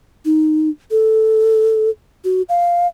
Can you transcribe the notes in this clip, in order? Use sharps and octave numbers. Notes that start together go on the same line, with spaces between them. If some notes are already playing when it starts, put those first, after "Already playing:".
D#4
A4
F#4
F5